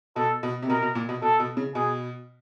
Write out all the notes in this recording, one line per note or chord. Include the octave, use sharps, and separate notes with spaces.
B2 A4
B2
C3
B2 A#4
B2
A#2
B2
B2 A4
B2
C#3
B2 G#4